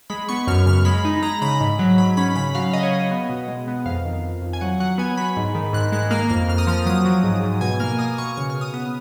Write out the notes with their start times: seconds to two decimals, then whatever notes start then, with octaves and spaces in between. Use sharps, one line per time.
0.10 G#3 B5
0.29 B3 C#6
0.47 F#2 F6
0.66 C#3 F6
0.85 G#3 B5
1.05 D#4
1.23 G#3 A#5
1.42 C#3 B5
1.61 G#2
1.79 F#3
1.98 G#2 B5
2.17 C#4 B5
2.36 C#3 B5
2.55 F#3 F5
2.73 C#3 D#5
2.83 C#5
2.91 C#3 D#5
3.11 B3
3.30 B2
3.48 G#3
3.68 B3
3.86 F2 F5
4.05 D#3
4.24 F2
4.42 F2
4.53 G#5
4.61 F#3 F#5
4.80 F#3 F#5
4.98 B3 G#5
5.17 F#3 B5
5.37 G#2
5.55 D#3
5.73 G#2 F#6
5.92 G#3 F#6
6.11 A#3 F6
6.29 F2 F6
6.48 F2 F6
6.58 D#6
6.67 F3 F6
6.86 F#3 D#6
7.05 F#3
7.24 G#2
7.43 G#2
7.61 B2 G#5
7.80 A#3 F6
7.99 A#3 D#6
8.18 B2 C#6
8.37 C#3 C#6
8.50 F6
8.55 C#3
8.61 D#6
8.74 B3 D#6